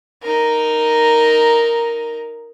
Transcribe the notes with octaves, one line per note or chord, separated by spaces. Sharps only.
D#4 A#4